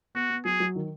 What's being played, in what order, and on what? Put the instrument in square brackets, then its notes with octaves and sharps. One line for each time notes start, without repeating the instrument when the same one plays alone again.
[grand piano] B3 [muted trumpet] F#4
[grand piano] B3
[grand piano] F#3 [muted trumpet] G#4
[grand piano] F#3
D#3